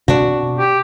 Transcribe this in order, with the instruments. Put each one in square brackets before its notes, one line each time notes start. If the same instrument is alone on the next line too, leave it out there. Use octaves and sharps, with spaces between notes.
[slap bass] B2 C4 [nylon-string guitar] D4 F#4
[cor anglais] G4